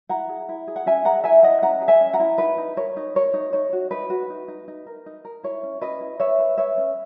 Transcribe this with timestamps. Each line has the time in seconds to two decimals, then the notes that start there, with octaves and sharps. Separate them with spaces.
0.09 E4 F#5 A#5
0.29 G#4
0.49 E4
0.68 G#4
0.76 F#5
0.86 C#4 E5 G#5
1.05 G#4 F#5 A#5
1.24 E4 E5 G#5
1.43 E4 D#5 F#5
1.63 C#4 F#5 A#5
1.82 G#4
1.88 E5 G#5
2.01 C#4
2.13 F#5 A#5
2.20 E4
2.38 D#4 B4
2.58 D#4
2.77 A#4 C#5
2.97 D#4
3.15 A#4 C#5
3.34 D#4
3.53 D#4 C#5
3.73 F#4
3.91 D#4 B4
4.10 F#4
4.30 D#4
4.48 D#4
4.68 D#4
4.86 A#4
5.06 D#4
5.25 A#4
5.43 E4 C#5
5.63 C#4
5.81 C#4 B4 D#5
6.01 E4
6.20 B4 C#5 E5
6.39 B4
6.57 B4 C#5 E5
6.77 C#4